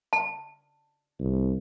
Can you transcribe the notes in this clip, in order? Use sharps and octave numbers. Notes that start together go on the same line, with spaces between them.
A5
C2